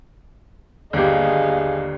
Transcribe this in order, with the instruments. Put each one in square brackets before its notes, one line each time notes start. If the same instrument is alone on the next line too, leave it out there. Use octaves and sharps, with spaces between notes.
[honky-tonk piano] G1 D#2 [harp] D3 G4 [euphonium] G#4 [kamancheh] D#5 F5